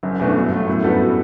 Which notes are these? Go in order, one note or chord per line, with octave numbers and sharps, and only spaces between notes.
F#1 F#2
E2 B2 A3 D4
G2
F#3 A3
F#2 A2
G2 G3 B3 F#4 A4